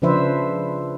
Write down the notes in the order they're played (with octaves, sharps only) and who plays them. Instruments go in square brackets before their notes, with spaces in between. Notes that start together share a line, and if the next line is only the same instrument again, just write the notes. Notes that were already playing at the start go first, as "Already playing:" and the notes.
[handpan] C#3 F3 D4 B4 C5 E5